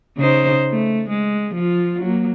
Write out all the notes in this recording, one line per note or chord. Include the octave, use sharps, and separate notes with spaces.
C#3 D#4 C5
A3
G#3
F3 F4
F#3 A#3